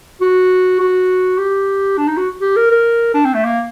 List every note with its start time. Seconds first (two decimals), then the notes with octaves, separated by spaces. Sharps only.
0.21 F#4
0.80 F#4
1.38 G4
1.97 D4
2.07 D#4
2.17 F#4
2.41 G4
2.56 A#4
2.71 A#4
3.14 D4
3.25 C4
3.34 A3
3.44 A#3